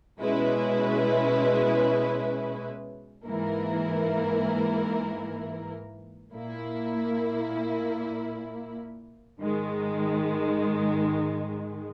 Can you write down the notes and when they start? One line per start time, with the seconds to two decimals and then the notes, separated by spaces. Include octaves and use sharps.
0.21 B2 G#3 C#4 E4 B4
3.26 G#2 E3 A#3 E4 A#4
6.32 A#2 A#3 E4
9.38 G#2 D#3 G#3